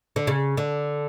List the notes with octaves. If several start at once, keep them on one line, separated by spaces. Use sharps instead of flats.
D3
C#3
D3